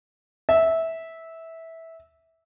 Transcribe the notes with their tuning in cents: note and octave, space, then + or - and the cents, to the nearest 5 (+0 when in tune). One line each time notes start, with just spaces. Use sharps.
E5 -15